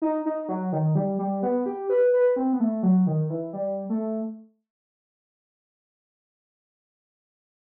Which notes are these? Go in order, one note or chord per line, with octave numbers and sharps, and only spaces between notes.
D#4
D#4
F#3
D#3
G3
G3
B3
G4
B4
B4
C4
B3
A3
F#3
D#3
E3
G3
A3